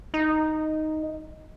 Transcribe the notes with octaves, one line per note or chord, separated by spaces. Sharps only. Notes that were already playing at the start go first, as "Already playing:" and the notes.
D#4